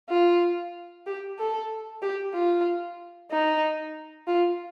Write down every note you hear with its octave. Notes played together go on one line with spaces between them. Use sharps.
F4
G4
A4
G4
F4
D#4
F4